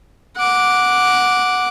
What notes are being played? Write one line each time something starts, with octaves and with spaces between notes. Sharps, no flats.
F#5 D6